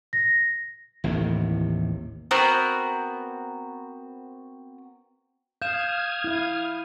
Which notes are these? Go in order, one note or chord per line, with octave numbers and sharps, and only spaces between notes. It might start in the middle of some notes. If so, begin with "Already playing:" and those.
A#6
A1 D#2 A2 C3
B3 C4 F#4 A#4
F5 D#6 F6 G6 G#6 E7
E4 F5